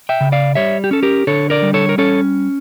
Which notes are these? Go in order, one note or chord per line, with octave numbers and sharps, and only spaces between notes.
E5 G5
C#3
D5 F5
G3 C#5 E5
G4
C#4 A4
G4 A#4
D3 A4 C#5
A#4 D5
G3
A4 C#5
A#4
C#4 A4 C#5